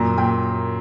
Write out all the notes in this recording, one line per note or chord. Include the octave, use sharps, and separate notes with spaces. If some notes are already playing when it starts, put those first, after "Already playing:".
Already playing: F#2 A#2 A#5
A#2 G5